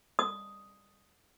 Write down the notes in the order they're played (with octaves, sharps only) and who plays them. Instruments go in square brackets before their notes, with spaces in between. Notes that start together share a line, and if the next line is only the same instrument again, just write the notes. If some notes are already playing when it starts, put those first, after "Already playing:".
[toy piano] D#6